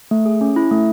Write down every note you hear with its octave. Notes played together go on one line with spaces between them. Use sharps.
A3
G#4
C#4
E4
A3